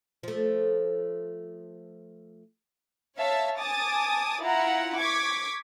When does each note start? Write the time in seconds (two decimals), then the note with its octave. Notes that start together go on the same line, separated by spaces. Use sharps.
0.23 F3 A3
3.18 C#5 E5 F5 A5
3.59 G#5 A5 D6 D#6 A6
4.42 E4 F4 F#5 A#5
4.98 C#6 D6 G#6 B6